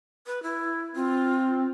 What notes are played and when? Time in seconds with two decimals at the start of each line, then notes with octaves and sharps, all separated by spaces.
0.26 B4
0.43 E4
0.95 C4 F4